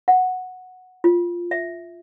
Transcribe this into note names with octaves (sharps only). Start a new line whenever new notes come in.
F#5
F4
E5